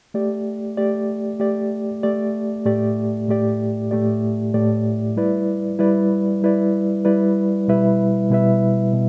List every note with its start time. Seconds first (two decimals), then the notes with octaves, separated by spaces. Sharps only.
0.14 A3 G4 D5
0.77 A3 G4 D5
1.39 A3 G4 D5
2.03 A3 G4 D5
2.65 A2 A3 G4 D5
3.28 A2 A3 G4 D5
3.91 A2 A3 G4 D5
4.54 A2 A3 G4 D5
5.16 G3 E4 B4 D5
5.79 G3 E4 B4 D5
6.42 G3 E4 B4 D5
7.05 G3 E4 B4 D5
7.68 B2 G3 E4 B4 E5
8.30 B2 G3 E4 B4 E5
8.93 B2